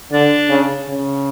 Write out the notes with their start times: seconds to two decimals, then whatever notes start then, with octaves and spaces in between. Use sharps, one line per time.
0.11 D3 D4
0.50 C#3
0.88 C#3